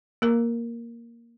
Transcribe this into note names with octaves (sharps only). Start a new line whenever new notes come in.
A#3 A#4